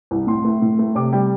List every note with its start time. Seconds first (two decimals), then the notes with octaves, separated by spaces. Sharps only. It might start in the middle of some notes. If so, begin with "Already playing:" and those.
0.11 C2
0.27 A2 C6
0.44 A3
0.62 A2
0.79 A3
0.95 C3 D6
1.12 G3 G5